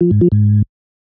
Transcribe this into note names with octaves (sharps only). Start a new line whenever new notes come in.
F3
G#2
F3
G#2